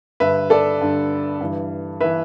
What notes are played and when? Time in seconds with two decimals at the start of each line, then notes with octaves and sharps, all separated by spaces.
0.20 G2 D3 B4 E5
0.50 A4 D5
0.81 G2 D3
1.41 G2 E3
2.01 E3 B4 E5